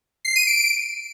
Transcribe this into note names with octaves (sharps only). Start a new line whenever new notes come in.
C7
D#7
D7